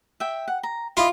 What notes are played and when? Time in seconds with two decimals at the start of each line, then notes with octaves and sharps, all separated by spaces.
0.20 E5 G5
0.48 F#5
0.63 A#5
0.97 E4 F4 D#5 D6